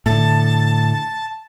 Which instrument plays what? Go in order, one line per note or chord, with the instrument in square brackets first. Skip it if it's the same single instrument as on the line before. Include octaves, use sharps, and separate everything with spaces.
[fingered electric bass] A2 D3 [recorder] A5